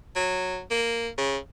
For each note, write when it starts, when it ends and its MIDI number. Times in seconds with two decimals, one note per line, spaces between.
0.16 0.61 54
0.71 1.08 58
1.18 1.37 49